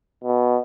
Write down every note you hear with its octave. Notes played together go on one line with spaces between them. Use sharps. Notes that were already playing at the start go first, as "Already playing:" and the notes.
B2